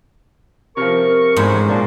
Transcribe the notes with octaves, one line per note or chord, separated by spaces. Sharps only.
C3 F3 A#4 C#6
A1 E2 G#2 C5
A#2 A#3 D4 A5